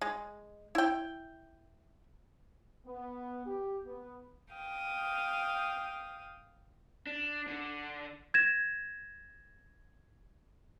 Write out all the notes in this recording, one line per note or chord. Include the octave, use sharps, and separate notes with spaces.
G#3
E4 G5
B3
G4
B3
F5 G5 D#6
D4
D3
G#6 A#6 E7